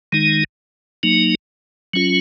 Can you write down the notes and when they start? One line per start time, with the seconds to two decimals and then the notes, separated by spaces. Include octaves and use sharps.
0.12 D#3 G#3 D#4
1.03 F#3 A#3 D#4
1.94 F#3 C#4 F4